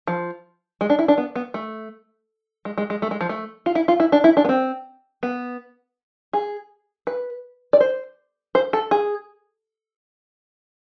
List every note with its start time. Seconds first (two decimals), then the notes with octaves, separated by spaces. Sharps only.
0.07 F3
0.81 G#3
0.90 D4
0.99 E4
1.08 D4
1.18 B3
1.36 B3
1.54 A3
2.65 G#3
2.78 G#3
2.90 G#3
3.02 A3
3.11 G#3
3.21 F3
3.29 A3
3.66 F4
3.75 E4
3.88 F4
4.00 E4
4.12 D4
4.24 E4
4.37 D4
4.45 B3
4.49 C4
5.23 B3
6.33 G#4
7.07 B4
7.73 D5
7.80 C5
8.55 C5
8.73 A4
8.91 G#4